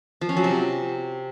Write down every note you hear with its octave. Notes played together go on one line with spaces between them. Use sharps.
F3
C#4
F#3
C3